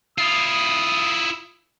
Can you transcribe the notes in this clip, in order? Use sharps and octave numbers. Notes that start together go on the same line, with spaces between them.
E4 F4 D#6